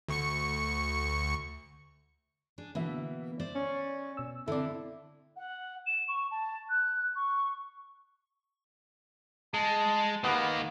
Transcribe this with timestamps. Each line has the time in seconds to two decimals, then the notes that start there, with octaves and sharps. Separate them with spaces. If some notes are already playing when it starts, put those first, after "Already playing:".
0.08 D2 C#6 C#7
2.58 D4 G#4
2.75 B2 D3 E3 A#3 E5
3.40 C5 D5
3.55 C#4
4.17 B2 E6
4.48 D3 C4 E4 A4 D5
5.36 F#5
5.86 E7
6.08 C#6
6.31 A5
6.69 F#6
7.16 C#6
9.54 G#3 A5
10.24 D#3 A#3 B3